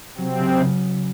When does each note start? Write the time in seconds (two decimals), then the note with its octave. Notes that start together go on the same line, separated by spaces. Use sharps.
0.17 C3 F#3 C4
0.39 C#3
0.60 C#3